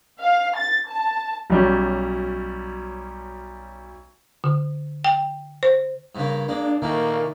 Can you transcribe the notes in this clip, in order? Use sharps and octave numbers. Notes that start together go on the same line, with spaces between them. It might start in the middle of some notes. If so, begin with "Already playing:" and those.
F5
A6
A5
B1 F#3 G3 C#4
D3
G5
C5
G2 C#3 A#3
G#3 A#3 D4
A#2 D#3 A3 A#3